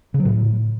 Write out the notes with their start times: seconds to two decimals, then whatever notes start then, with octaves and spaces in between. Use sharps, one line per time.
0.14 C#3
0.20 F#3
0.25 A2